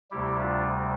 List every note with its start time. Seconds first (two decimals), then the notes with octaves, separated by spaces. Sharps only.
0.11 D2 C3 G3 E4 G4
0.40 D4 F4